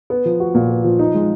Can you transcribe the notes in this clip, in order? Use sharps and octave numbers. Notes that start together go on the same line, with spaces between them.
B3
F3
F#4
A#2
B3
F3
D#4
G#3